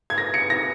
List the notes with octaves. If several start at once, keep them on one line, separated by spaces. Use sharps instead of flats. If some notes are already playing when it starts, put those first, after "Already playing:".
G#6
A#6
C#7
A#6